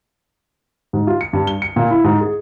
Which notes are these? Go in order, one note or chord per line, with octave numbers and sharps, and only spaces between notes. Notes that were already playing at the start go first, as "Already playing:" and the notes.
G#2
F4
C#7
G2
G7
C#7
A#2
E4
G#2
G#4